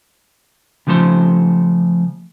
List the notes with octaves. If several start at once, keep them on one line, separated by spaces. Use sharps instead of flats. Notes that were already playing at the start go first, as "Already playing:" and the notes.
C#3 F3 A3 A4 C5